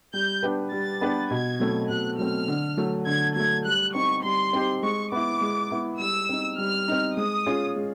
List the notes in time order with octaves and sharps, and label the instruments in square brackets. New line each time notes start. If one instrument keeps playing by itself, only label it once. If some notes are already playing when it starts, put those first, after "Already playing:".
[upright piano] G3 [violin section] G6
[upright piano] B3 D4 G4 B4
[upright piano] G3 [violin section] A6
[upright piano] B3 D4 G4 B4
[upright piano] B2 [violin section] G#6
[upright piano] F#3 A3 C4
[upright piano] B2 [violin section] F#6
[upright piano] F#3 A3 C4 [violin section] F6
[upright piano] D3
F#3 A3
[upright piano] D3 [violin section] G#6
[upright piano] F#3 A3 [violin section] G#6
[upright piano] G3 [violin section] F#6
[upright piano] C4 D#4 G4 C5 [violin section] C#6
[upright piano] G3 [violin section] C6
[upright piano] C4 D#4 G4 C5
[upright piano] G#3 [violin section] C#6
[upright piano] B3 E4 [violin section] D6
[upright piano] G#3
B3 E4
[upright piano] G3 [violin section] E6
[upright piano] C4 D#4
[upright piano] G3 [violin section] F6
[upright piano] C4 D#4
[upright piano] G#3 [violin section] D#6
[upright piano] C#4 F4 G#4
G#3